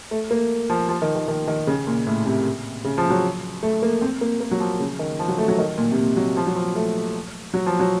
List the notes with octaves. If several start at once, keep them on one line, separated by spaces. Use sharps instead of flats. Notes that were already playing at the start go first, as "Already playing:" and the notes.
A3
A#3
F3
F3
D#3
D#3
D#3
D#3
C#3
A#2
A2
C3
C#3
F3
F#3
A3
A#3
C4
A#3
A#3
F#3
F3
C#3
D#3
F3
F#3
A3
F#3
D#3
A#2
C3
A#2
F#3
F3
F#3
F3
A3
F#3
F3
F#3